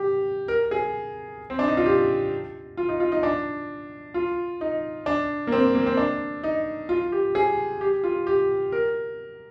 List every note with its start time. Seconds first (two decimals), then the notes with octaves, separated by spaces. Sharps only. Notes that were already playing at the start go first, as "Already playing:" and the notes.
Already playing: G4
0.48 A#4
0.71 G#4
1.50 C4
1.59 D4
1.67 D#4
1.77 F4
1.86 G4
2.77 F4
2.89 D#4
3.00 F4
3.12 D#4
3.23 D4
4.14 F4
4.61 D#4
5.06 D4
5.47 A#3
5.52 C4
5.75 A#3
5.86 C4
5.97 D4
6.43 D#4
6.89 F4
7.12 G4
7.35 G#4
7.81 G4
8.04 F4
8.27 G4
8.72 A#4